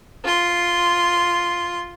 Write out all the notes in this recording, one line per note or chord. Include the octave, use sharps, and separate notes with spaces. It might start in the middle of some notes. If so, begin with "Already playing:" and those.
F4 C6